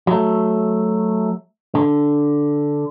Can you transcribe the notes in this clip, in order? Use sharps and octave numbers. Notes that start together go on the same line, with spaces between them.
F#3 A3
D3